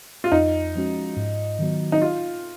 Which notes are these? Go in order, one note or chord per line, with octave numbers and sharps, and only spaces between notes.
F4
F2 D#4
F3 G#3 C#4 F#4
G#2
D#3 F#3 B3 F#4
D#4
F4